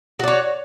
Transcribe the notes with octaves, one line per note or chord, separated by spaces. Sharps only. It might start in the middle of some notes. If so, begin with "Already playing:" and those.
F#4 C#5 D5